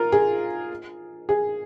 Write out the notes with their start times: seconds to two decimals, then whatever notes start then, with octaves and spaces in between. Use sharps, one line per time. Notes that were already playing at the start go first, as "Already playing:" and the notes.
Already playing: F4 A#4
0.12 G#4
1.29 G#4